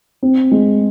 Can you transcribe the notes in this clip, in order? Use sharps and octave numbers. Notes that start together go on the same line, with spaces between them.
C4
G#3